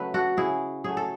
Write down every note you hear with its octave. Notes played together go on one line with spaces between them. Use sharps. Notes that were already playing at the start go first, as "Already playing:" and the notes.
Already playing: C#3 F#3 A3 B4
F#4 A4
C#3 E4 G#4
F#3 A3 G#4
A4